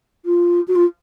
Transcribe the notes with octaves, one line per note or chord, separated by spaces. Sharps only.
F4
F#4
F4